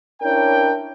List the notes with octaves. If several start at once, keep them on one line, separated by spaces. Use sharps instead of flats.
C#4 D4 E4 A#4 C#5 G5